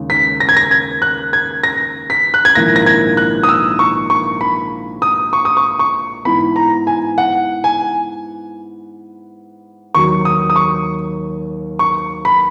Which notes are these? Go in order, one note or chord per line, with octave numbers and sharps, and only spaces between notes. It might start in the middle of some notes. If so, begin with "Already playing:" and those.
Already playing: D#2 C#3 G#3
B6
A#6
G#6
A#6
G#6
F#6
G#6
A#6
B6
F#6
G#6
A#1 G#2 D#3 A#3 E4 A#6
A#6
G#6
F#6
D#6
E6
C#6
C#6
B5
D#6
C#6
D#6
C#6
C#6
G#2 E3 B3 B5
A#5
G#5
F#5
G#5
D#2 D#3 F#3 C#6
D#6
D#6
C#6
C#6
B5